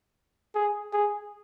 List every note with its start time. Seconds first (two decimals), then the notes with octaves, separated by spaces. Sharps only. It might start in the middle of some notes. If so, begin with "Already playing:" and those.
0.55 G#4
0.93 G#4